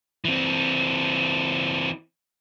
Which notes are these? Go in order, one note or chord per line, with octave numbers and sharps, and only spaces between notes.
E3 C4